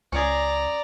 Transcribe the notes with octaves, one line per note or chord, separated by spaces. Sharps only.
C#2 C#4 G#4 D5 A#5